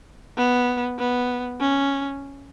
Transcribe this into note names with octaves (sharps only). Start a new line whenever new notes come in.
B3
B3
C#4